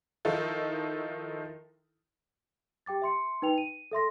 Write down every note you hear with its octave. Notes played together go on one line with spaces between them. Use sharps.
D#3 F3 D#4 E4 A4
G4 G5 D6 A6
E5 C6 C#7
D#4 B4 G5 F7
D#7
A4 E5 C6 A#6